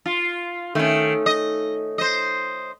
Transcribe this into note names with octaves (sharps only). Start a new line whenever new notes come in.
F4
D#3 A3 C#4
D#5
C5 D#5